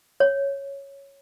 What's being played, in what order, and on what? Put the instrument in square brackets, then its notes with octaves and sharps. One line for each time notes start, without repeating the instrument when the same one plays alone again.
[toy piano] C#5